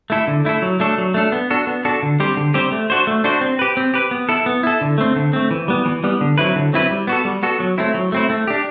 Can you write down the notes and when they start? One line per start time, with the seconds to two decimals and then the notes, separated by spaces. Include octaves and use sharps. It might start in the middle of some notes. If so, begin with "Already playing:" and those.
0.10 A3 E4 A4
0.27 D3
0.45 A3 E4 A4
0.62 F#3
0.80 A3 D4 A4
0.98 F#3
1.14 A3 D4 A4
1.32 B3
1.50 D4 F#4 A4
1.67 B3
1.85 D4 F#4 A4
2.03 D3
2.20 G3 C4 G4 C5
2.37 D3
2.54 G3 C4 G4 C5
2.72 A3
2.90 D4 F#4 C5
3.07 A3
3.24 D4 F#4 C5
3.41 C4
3.59 G4 B4
3.77 C4
3.94 G4 B4
4.11 B3
4.29 E4 A4
4.46 B3
4.63 E4 A4
4.81 D3
4.98 A3 C4
5.16 D3
5.33 A3 C4
5.51 E3
5.68 G3 B3
5.85 E3
6.04 G3 B3
6.21 D3
6.38 F#3 C4 E4 B4
6.56 D3
6.73 F#3 C4 E4 B4
6.91 G3
7.07 B3 F#4 A4
7.25 G3
7.43 B3 F#4 A4
7.60 F#3
7.78 A3 C4 E4
7.95 F#3
8.12 A3 C4 E4
8.30 A3
8.48 D4 G4